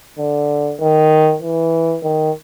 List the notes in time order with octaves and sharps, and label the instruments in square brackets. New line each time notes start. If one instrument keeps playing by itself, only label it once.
[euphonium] D3
D#3
E3
D#3